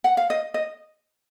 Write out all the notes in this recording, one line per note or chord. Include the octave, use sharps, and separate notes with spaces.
F#5
F5
D#5
D#5